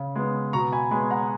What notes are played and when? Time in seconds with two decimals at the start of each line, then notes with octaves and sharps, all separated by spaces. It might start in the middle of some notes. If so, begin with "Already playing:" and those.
Already playing: C#3
0.16 G#3 B3
0.53 B2 A#5 C#6
0.72 G#5 B5
0.91 G#3 B3 G#5 B5
1.11 F#5 A#5